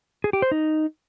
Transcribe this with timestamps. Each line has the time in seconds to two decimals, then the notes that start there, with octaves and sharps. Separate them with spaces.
0.24 G#4
0.33 G4
0.42 C5
0.52 D#4